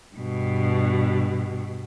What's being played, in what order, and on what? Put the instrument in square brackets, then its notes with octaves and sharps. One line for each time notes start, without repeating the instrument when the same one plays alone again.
[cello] G2 B2